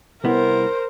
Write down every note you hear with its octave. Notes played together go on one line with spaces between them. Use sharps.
C2 B3 E4 A#4 C5